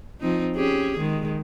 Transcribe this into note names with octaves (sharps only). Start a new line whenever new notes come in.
F3 C4 D#4
C#4 G4 G#4
D#3 G#3